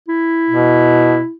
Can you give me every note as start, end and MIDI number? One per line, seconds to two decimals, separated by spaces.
0.08 1.34 64
0.50 1.21 47